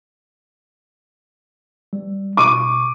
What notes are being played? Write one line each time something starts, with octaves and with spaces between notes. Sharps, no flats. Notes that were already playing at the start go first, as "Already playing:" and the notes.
G3
B2 C#6 D6 D#7